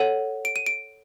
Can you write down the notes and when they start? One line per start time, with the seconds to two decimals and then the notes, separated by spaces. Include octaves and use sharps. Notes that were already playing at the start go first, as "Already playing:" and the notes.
Already playing: A4 C#5 F#5 D#7
0.45 D7
0.56 D#7
0.66 D7